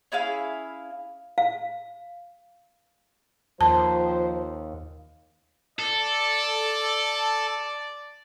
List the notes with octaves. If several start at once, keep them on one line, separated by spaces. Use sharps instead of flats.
C#4 E4 G#4 F5
F5
D#2 F3 C5 A5
A4 D5